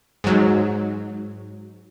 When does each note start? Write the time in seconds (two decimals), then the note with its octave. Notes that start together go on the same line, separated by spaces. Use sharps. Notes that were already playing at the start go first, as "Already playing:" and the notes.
0.24 G#2 F#3